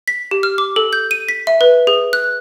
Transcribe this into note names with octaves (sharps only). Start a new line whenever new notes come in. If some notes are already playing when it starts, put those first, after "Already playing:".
B6
G4
F6
D6
A4
G6
D#7
B6
E5
B4
G#4
F#6